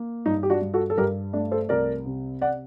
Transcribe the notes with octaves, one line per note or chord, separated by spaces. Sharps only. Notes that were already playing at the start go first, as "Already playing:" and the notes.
Already playing: A#3
G2 D#4
G4
D4 F#4
G2
F#4 A4
A4
G2 G4 A#4
A3 D4
A4 C5
C2 A#4 D5
C3
D5 F#5